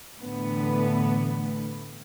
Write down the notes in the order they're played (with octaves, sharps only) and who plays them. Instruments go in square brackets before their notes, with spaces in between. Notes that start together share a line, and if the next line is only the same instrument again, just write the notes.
[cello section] A2 D3 E3 A3 B3 B4